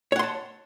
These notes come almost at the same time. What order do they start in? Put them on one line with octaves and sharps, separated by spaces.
C#5 F#5 C6 A5